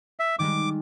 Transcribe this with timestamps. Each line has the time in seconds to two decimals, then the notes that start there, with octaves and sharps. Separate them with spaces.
0.19 E5
0.39 D#3 G3 G#3 D6